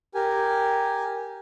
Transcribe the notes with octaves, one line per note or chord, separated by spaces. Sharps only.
G4 A#4 G#5